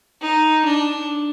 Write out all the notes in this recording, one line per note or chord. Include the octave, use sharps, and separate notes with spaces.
D#4
D4